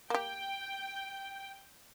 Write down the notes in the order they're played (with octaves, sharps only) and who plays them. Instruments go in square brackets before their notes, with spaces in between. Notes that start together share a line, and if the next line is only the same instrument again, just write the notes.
[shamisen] A#3 G4 [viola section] G5